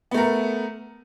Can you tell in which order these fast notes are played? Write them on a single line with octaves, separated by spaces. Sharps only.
B3 A3 A#4